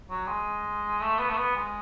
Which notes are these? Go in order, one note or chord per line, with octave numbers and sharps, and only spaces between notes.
F#3
G#3
A3
B3
A3
B3
G#3